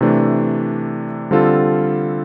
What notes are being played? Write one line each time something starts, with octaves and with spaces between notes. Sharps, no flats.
C3 E3 A3 D4
D3 G3 C4 F4 A4